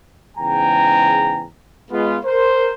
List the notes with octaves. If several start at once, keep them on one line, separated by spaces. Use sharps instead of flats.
E2 G#2 C#3 G5 G#5 A#5
G#3 B3 F4
A#4 C5